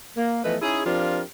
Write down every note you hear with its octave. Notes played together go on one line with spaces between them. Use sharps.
A#3
E3 F3 A3 B3 B4 D#5
C#4 D#4 E4 G#4
F3 C4 D4 F4 G4 A#4